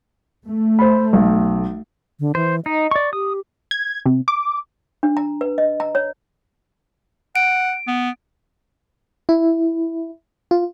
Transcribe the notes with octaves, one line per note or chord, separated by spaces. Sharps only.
A3
C5 B5
B1
D3
E3 C5
D#4 D#5
D5 C#6
G4 D#6
G#6
C3
D6
D4
A#5
B4
D#5
A#5
C#5
F#5 D7
B3
E4
F4